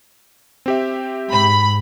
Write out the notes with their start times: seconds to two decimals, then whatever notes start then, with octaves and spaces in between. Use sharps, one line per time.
0.66 C4 G4 E5
1.30 G#2 B5